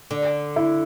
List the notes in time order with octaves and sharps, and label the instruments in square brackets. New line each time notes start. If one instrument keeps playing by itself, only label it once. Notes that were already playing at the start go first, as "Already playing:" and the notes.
[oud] D3
[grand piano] E4